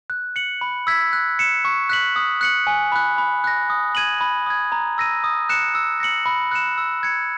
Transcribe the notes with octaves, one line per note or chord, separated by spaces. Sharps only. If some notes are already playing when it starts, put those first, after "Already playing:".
F#6
C#7 F#7
B5
E6 G#6 B6
F#6
C#7 E7
C#6
F#6 B6 F#7
D#6
F#6 C#7 F#7
G#5
B5 F#6
B5
F#6 A#6
D#6
G#6 D#7 F#7
B5
D#6 G#6
A#5
E6 A#6 D#7
D#6
F#6 C#7 E7
E6
A#6 C#7 F#7
B5
F#6 C#7 E7
E6
G#6 C#7